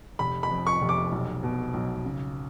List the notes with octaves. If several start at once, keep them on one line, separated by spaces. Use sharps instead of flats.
F1 B5
B5
F2
C#6
F1
D6
B1
B2
B1
C#3